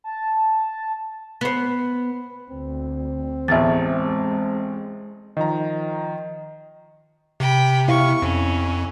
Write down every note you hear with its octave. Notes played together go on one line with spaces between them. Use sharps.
A5
B3 C5
D2 C4
A1 E2 G#3 E5 A6
D#3 F3 D#5 A#5
C3 G5 B5
B2 E4 F5 C#6
F2 C#4